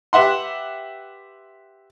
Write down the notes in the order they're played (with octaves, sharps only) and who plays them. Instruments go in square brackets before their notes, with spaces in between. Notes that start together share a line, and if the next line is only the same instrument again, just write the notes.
[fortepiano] G4 B4 E5 F#5 C6